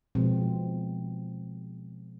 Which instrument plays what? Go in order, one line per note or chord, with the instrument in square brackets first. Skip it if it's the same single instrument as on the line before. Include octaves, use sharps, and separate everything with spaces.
[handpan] B2 F3 G#3 C4